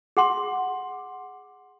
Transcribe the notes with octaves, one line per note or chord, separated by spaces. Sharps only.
G#4 F#5 C6